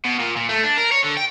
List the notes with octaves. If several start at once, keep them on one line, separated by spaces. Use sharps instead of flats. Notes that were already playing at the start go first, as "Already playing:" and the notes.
B2
A#2
A#2
A3
D4
A#4
C#5
D3
G5